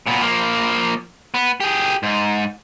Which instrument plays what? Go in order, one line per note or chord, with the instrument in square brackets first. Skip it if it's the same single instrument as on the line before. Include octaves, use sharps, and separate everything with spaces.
[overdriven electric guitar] A#2 B3
F3 A#3
B3
G4 G#4
G#2